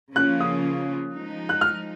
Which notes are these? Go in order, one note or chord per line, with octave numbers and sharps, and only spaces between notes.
C#3 F3 A#3 C#4 F4 F#6
D#6
F3 G#3 D#4
F#6
F6